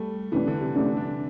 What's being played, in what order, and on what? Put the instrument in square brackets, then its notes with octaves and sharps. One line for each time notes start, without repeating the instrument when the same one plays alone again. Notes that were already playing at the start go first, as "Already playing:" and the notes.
Already playing: [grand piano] G3 A3
[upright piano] C3 A3 D4 [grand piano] E3
[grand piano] D3
C3
[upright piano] C3 A3 D4
[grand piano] D4